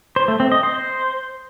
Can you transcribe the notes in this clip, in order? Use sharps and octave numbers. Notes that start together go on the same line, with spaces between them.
C5
A3
C4
D#5
C5